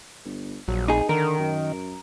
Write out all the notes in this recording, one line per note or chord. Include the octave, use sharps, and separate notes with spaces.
G1
A#1 F#3
F1 D#4 G#4
D3 D#3 A#4
F#2